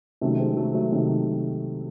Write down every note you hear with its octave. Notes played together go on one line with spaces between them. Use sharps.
C3 D#3 F#3 A3 C#4
G#3 C4
F#3 A3
F#3 A3
C3 D#3 F#3